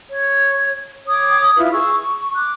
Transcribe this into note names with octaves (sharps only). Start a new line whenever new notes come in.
C#5
C#5 D6 D#6
E4 F4 B4
G#4 C#6 E6
C#6
D6 F#6